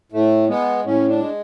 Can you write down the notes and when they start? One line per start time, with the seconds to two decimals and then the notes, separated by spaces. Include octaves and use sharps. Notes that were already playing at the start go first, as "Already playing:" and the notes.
0.12 A2 A3
0.48 G#3 B3
0.85 A2 C#4
1.08 D4
1.20 G#3